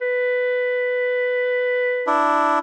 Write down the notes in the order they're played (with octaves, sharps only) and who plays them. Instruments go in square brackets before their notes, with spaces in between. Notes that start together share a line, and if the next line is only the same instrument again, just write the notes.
[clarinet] B4
[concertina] D4 E4